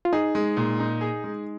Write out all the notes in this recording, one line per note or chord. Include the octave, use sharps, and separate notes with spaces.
F4
D#4 G#4
G#3
A#2
D#4
G#4
G#3